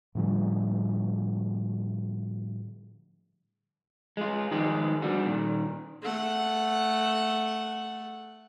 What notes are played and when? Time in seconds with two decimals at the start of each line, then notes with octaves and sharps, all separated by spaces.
0.15 A2 D3 F3 G3
4.17 G#3 F4
4.51 D#3 F3 G#3 G4
5.02 D3 G3 F#4
5.26 A#2 D#3
6.02 A3 F#5